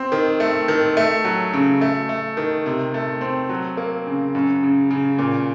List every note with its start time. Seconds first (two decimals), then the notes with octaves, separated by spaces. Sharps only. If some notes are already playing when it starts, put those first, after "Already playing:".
Already playing: C4
0.12 D#3
0.40 A3
0.68 D#3
0.97 A3
1.25 F#3
1.53 C#3
1.81 A3
2.09 A3
2.37 D#3
2.66 C3
2.94 A3
3.21 C4
3.49 F#3
3.77 A#3
4.07 C#3
4.35 F#2
4.63 C#3
4.91 C#3
5.19 A#2